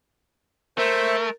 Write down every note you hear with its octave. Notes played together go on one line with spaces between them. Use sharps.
A3 A#4 C5 E5